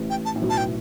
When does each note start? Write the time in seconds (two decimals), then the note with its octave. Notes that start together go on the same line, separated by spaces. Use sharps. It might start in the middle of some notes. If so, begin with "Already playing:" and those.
Already playing: A1 A2
0.10 G5
0.25 A5
0.36 A2
0.42 B1 B2
0.50 A5
0.58 G5